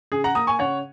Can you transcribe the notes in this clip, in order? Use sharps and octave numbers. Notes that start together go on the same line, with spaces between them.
C#3 G#4
F#5 A#5
A#3 A#5 D#6
G#5 C#6
C#3 C#5 F#5